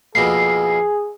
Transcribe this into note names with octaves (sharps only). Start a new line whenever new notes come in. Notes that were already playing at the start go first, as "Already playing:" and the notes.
F2 B2 A#3 G#4 C7